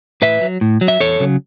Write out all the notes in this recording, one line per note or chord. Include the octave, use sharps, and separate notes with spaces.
A2 B4 E5
F#3
A2
F#3
E5
E2 A4 C#5
C#3 F#3